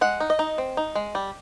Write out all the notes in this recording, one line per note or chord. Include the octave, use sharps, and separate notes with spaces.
G#3 F#5
D#4
D#5
D#4
C4
D#4
G#3
G3